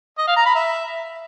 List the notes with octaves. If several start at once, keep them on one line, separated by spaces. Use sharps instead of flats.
D#5
F5
A#5
B5
E5